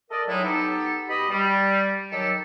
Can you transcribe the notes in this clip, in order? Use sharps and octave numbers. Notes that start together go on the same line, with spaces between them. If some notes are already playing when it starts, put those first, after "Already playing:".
A4 A#4 D5 D#5
A2 F#3 G#3 D#4 E4
B3 D#4 G4 A4
B2 G4 D#5 B5
G3
D#3 F#3 G4 A4